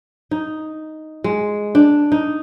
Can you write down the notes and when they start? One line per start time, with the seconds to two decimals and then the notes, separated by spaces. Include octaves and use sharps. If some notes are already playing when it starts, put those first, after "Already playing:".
0.31 D#4
1.24 G#3
1.75 D4
2.12 D#4